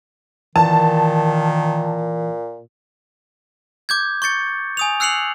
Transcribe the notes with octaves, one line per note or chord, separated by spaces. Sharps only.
A#2 D#3 E3 A5
D6 G6 G#6
C#6 G6 A6 C#7
G#5 D#6 F7
E6 F#6 C7 C#7 F7 F#7